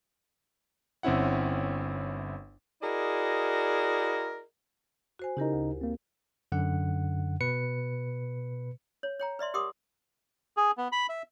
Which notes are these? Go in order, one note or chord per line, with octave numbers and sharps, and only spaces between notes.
G1 C4 C#4 E4 F#5
E4 F#4 G#4 A#4 D5 D#5
F#4 C5 G#5
C#3 D#4 E4 G4 A#4
D2
A#3 C4
F#2 D3 F#5
B2 B4 C#7
C#5
C#5 G5 A#5
B4 D5 E5 C6
G4 A#4 F#5 C6 D6 D#6
G#4
B3
B5
E5